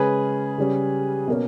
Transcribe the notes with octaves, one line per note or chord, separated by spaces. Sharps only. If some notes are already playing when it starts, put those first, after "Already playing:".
Already playing: C#3 G#3 C#4 G#4 B4
C#3 G3 C#4
B2 A#3 C#4